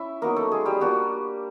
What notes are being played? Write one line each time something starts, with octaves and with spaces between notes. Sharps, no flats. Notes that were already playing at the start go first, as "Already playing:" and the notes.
Already playing: C#4 E4 E5
F#3 A#3 B3 D#4 A#4
A3 A4
G#3 G#4
G3 G4
G3 A#3 D4 F4 F#4